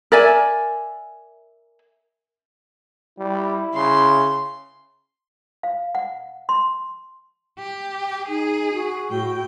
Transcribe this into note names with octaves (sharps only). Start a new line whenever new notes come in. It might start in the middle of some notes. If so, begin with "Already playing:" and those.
A#4 D5 E5 G#5
G3 E4
C#3 C6
F5
F#5
C6
G4
D#4 G#4
F#4
A2 G5